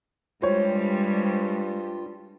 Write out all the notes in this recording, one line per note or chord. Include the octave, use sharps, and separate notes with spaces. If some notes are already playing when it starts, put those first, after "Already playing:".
G2 G3 G#3 F4 C5 C#5